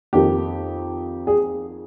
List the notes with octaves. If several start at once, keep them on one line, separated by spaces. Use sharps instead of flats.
F2 D#3 A#3 G4
G#4